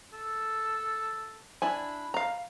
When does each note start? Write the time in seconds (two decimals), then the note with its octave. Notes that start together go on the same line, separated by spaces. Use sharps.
0.13 A4
1.62 D4 E4 G#5 B5
2.14 F5 A#5